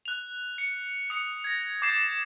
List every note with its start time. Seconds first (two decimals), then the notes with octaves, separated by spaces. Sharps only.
0.06 F#6 F7
0.58 C#7
1.10 D#6 C#7
1.44 G#6 A#6
1.82 D6 G6 A6 C7 E7